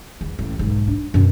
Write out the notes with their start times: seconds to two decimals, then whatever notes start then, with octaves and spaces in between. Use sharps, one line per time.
0.21 E2
0.39 A1
0.59 B1 G#2
0.87 D4
1.14 F#2 B2